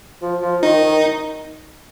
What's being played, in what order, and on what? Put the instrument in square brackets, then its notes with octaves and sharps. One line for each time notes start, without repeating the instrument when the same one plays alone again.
[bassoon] F3
F3
[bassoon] D#3 [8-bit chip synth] D#4
[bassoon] D#3